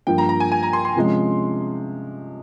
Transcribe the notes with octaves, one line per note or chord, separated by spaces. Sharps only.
G2 F3 A#3 G5
A#5
A#5
G#5
G#5
A#5
C6
C6
C3 F3 G#3 C#4